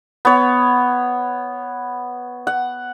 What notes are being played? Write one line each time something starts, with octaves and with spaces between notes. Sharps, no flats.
B3 C#5
F#5